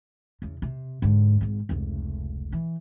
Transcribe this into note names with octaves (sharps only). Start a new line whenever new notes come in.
E2 C#3
C3
G#2 D3
G#1 G#2
F1 C#2
E3